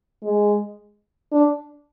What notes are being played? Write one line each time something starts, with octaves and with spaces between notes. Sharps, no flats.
G#3
D4